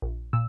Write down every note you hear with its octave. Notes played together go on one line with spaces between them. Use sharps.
A#1
A#2 E6